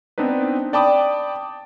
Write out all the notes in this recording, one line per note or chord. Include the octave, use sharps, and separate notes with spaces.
B3 C4 D4 D#4 B4
D5 G5 A5 B5 D6 D#6